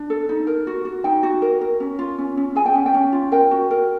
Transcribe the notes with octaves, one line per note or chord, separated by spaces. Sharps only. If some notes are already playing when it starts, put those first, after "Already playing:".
Already playing: D4
A4
D#4
A#4
F#4
F#4
D#4 G5
F#4
A#4
A#4
C#4
F4
C#4
C#4
G#4 G#5
G5
C#4 F#5
G5
C#4
F4
A#4 G5
F#4
A#4